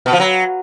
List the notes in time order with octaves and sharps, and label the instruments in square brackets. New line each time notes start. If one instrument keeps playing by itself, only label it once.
[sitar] B2
F3
F#3